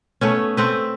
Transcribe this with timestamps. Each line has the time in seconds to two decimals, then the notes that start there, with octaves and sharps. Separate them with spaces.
0.21 A3 B3 C#4
0.57 A3 C4 B4